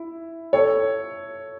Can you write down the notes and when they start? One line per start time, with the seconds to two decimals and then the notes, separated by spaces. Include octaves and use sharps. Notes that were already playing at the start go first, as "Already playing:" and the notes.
Already playing: E4
0.53 A4 C#5